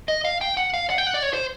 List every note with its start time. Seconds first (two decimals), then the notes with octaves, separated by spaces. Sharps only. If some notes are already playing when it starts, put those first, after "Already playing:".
0.08 D#5
0.25 F5
0.41 G5
0.57 F#5
0.74 F5
0.90 F#5
0.98 G5
1.07 F#5
1.14 D5
1.22 C#5
1.34 C5